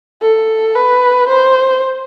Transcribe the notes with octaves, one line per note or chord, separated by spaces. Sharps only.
A4
B4
C5